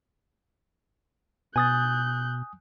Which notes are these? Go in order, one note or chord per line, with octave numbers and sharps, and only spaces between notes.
B2 G#5 D#6 F#6 G6 A6